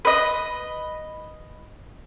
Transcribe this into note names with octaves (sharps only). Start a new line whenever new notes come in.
B4 D#5